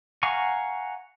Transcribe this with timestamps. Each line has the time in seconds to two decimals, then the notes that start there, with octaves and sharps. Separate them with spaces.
0.23 F5 F#5 G#5 A#5 C#6